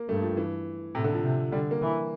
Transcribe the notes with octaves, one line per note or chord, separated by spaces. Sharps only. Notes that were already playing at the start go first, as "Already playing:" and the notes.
Already playing: A#3
G2 A3
F3
E3
A2 C3
D3
F3
C3
D3 G3
A#3
E3